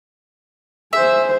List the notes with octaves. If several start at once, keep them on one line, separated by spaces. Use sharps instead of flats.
G#4 C5 E5